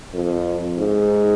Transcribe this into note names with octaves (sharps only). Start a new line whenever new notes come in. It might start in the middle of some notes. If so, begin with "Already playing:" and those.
F2
G#2